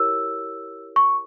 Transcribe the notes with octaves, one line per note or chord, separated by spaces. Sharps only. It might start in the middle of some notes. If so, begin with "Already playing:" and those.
Already playing: E4 G4 A#4 C#5 E6
C#6